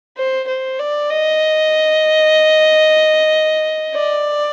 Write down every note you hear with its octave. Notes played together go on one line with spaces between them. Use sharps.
C5
C5
D5
D#5
D5